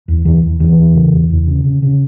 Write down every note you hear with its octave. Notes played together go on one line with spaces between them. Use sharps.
E2
E2 E3
E2
E2 E3
E2
C#3
E2
E2
C#3
C#3
C#3